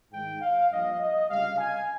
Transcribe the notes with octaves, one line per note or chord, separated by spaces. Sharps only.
G#2 D#3 G#3 D#4 G5
F5
G2 F3 A#3 D#5
D#5
C#2 C3 G3 F5
G#5